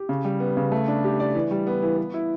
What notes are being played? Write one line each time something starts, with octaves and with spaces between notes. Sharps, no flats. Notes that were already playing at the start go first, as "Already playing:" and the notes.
Already playing: G4
C#3
G3
B3
C#3
A3
D4
G4
D5
E3
G3
B3
E3
B3
E4